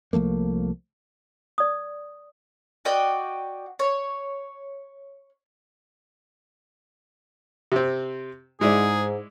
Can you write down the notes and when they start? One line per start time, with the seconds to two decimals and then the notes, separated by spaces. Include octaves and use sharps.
0.13 C2 F3 A3 A#3
1.58 D5 D#6
2.85 F#4 D5 D#5 G5
3.79 C#5
7.72 C3 C4
8.61 G#2 G#3 E4 G#4 D5